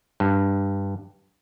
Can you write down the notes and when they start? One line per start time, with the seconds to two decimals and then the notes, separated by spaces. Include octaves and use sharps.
0.20 G2